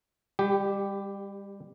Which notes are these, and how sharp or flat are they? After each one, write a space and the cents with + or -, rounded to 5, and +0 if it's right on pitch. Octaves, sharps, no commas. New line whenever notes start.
G3 +30 G4 +0